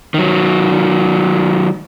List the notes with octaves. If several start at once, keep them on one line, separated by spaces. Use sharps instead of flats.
D#3 F#3